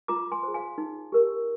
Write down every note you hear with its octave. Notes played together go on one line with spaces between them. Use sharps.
F4 A#5 D6
G#5 C6
G#4 C5
F5 G#5
D#4
G4 A#4